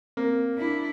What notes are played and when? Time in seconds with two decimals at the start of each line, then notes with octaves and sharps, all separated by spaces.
0.17 A#3 C4
0.55 D4 E4